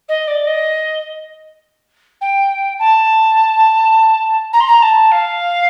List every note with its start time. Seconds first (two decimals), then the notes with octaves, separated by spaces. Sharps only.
0.08 D#5
0.27 D5
0.46 D#5
2.21 G5
2.79 A5
4.53 A#5
4.60 C6
4.67 A#5
4.82 A5
5.11 F5